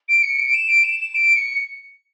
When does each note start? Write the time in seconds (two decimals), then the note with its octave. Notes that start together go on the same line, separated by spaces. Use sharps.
0.08 D7
0.23 C#7
0.38 D7
0.54 E7
0.69 D7
0.84 E7
1.00 E7
1.15 D7
1.36 C#7